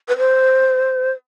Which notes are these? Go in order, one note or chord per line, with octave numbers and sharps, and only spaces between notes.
B4
C5